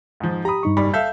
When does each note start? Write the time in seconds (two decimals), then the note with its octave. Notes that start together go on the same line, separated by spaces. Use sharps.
0.20 G#2 F3
0.45 G4 A#5 B5 D#6
0.63 G2 D#4 C#6
0.77 F#1 G3 B5
0.94 A4 E5 F5 G6